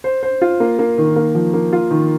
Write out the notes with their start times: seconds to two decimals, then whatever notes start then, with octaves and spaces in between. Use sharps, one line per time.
0.04 C5
0.23 C5
0.42 F4
0.60 A#3
0.79 A#3
0.98 D#3
1.16 A#3
1.35 F3
1.54 A#3
1.73 F4
1.91 D#3